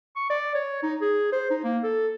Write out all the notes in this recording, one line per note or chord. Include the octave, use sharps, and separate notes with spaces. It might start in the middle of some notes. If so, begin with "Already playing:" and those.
C#6
D5
C#5
D#4
G#4
C5
D#4
A#3
A4